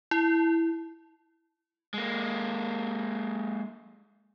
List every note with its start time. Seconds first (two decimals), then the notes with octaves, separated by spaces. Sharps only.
0.11 E4
1.94 G#3 A#3